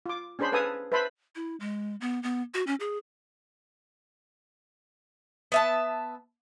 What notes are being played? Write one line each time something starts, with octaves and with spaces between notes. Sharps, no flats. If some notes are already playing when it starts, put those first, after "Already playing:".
F4 D6
C#4 D4 G#4 C5 B5 C6
G#4 A4 B4 F5 G#5 D#6
B4 C5 E5 A5 B5 C6
E4
G#3
B3
B3
F#4
C#4
G#4
B3 E5 A5